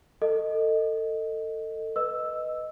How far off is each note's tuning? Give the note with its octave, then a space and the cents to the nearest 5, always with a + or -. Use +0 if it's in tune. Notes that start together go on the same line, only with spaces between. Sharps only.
A4 +30 D#5 +0
B4 +0 D#5 +0 E6 +0